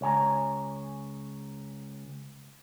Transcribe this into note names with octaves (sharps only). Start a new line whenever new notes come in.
C#2 C#5 G#5 A#5